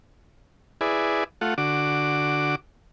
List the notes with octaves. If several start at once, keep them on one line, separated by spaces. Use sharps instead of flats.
E4 G#4 B4 D5
A3 F4 F#5
D3 F#4 D6